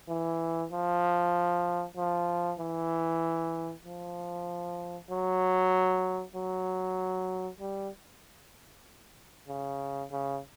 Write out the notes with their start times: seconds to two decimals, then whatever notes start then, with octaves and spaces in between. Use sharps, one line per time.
0.09 E3
0.72 F3
1.97 F3
2.59 E3
3.84 F3
5.10 F#3
6.35 F#3
7.60 G3
9.48 C#3
10.12 C#3